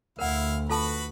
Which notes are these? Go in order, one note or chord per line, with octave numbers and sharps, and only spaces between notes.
D2 E4 A#4 F5 F#5
F4 F#4 A4 B4 A5 B5